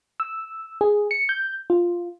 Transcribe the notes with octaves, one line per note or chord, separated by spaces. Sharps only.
E6
G#4
C#7
G6
F4